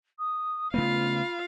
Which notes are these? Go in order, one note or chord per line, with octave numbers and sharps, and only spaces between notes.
D#6
C#3 A3 B3 F4 F5 B5